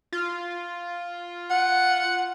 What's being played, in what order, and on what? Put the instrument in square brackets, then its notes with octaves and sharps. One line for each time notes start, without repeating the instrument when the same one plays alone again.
[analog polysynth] F4
[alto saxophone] F#5